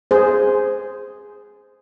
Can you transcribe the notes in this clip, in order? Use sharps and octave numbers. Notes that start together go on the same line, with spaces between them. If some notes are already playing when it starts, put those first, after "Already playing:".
G#4 C5